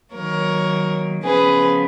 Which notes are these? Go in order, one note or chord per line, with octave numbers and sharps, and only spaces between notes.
D#3 F#3 A#3 A#4 C#5
C#3 F3 B3 G#4 B4